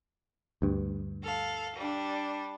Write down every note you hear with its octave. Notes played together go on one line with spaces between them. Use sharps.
D2 G2
A4 F5
G3 D4